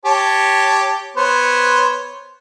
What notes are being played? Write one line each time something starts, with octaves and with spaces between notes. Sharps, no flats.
G4 C#5 A5
B3 C5 C#5